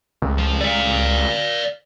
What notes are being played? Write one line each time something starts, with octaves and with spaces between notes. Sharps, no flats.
C#2
F3
D5 F5